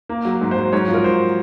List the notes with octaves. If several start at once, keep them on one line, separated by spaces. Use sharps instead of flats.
A#3
F#3
G#2
C5
F#3
G#2 C#5
F3
A#4
G#2 C5